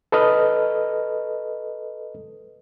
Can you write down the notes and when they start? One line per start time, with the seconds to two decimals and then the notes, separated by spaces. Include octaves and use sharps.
0.12 A4 B4 D#5 F6